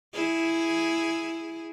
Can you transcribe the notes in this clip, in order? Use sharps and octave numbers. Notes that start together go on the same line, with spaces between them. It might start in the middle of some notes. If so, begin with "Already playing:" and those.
E4 G#4